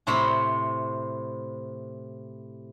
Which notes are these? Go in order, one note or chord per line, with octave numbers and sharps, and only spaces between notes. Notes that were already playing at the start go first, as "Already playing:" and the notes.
A2 C3 C5 C#5 B5